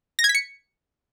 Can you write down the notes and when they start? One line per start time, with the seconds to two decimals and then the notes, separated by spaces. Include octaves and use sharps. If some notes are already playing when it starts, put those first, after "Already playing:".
0.19 A#6
0.24 G#6
0.29 B6
0.35 C#7